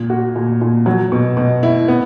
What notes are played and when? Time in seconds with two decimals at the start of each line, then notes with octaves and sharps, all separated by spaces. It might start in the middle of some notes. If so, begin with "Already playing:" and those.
Already playing: A#2
0.10 F#4
0.36 A#2
0.61 A#2
0.86 F#3
1.12 B2
1.37 B2
1.63 E4
1.88 B3